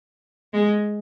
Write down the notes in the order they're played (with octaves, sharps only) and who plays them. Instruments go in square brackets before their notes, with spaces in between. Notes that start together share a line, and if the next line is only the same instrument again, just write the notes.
[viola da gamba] G#3